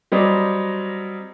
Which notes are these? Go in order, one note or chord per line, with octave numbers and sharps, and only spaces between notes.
F#3 G3 C4 D5 D#5